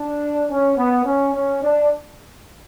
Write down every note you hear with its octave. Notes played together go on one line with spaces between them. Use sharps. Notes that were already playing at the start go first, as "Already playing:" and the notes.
Already playing: D4
C#4
B3
C#4
C#4
D4